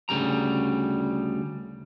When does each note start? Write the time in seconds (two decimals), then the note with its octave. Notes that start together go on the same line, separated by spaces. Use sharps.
0.09 D2 C#3 G3 A#5